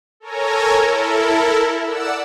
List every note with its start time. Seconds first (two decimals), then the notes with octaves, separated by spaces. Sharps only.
0.20 A4 A#4 C#5 G#5 A#5
0.82 E4 A4 A#4
1.84 D5 F#5 E6